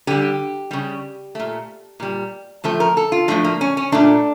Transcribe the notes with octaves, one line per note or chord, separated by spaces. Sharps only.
D3 G3 G4
C#3 G3
A#2 A3
A#2 G3
A2 F3 A3 A4
A#4
A4
F4
A2 F3 A3 D4
A#3
C#4
C#4
A#2 A3 D4